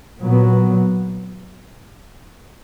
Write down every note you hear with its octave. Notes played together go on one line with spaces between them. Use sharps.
A#2 F#3 B3